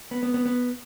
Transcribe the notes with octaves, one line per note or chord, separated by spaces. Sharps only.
B3
B3
B3
B3